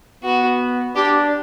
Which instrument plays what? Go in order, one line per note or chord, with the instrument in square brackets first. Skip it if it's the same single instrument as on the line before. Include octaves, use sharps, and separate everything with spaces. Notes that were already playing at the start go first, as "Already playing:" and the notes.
[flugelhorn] B3 [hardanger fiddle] F#4
[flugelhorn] D4 [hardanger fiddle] G4